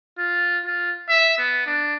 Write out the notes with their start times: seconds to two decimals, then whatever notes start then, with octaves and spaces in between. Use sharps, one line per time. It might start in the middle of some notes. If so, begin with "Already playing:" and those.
0.19 F4
0.66 F4
1.09 E5
1.38 B3
1.67 D4